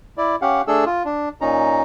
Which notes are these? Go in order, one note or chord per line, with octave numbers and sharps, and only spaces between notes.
E4 D5
C#4 G4 F5 F#5
A3 D4 G#4 A4 E6
F4
D4
A#2 C#4 D#4 A#5